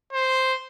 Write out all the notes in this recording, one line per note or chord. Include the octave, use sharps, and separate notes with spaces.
C5